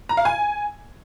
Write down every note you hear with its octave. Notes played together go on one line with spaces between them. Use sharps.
A#5
F5
G#5